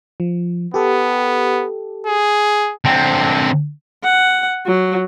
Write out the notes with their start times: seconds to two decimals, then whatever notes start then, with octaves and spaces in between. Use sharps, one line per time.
0.20 F3
0.74 B3 G4 A4
2.06 G#4
2.85 D3 C4
4.04 F#5
4.66 F#3